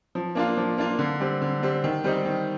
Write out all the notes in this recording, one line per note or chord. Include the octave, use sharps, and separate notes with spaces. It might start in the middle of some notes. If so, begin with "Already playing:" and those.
F3
A#3 D4 F4
F3
A#3 D4 F4
D3
G3 C4
D3
G3 C4
D#3
G3 C4 D#4
D#3